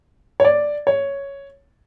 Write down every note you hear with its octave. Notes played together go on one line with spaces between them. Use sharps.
C#5
D5
C#5